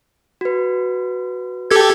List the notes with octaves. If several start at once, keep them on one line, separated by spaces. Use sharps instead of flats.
F#4 B4
G4 A4 G#6